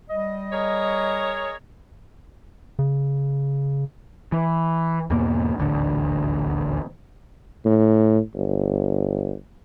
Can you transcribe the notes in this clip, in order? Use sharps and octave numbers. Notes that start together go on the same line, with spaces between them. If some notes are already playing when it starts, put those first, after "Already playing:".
G3 D#5
G#4 A#4 C#5
C#3
E3
E2 G#2 B2 A#3
D#1 A1 D2 D3
A2
G1